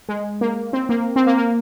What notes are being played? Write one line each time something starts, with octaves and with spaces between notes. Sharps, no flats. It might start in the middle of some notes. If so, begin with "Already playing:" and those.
G#3
A#3
C4
A#3
C4
A#3
A#3